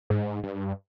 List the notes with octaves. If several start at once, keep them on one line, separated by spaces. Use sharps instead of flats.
G#2
G2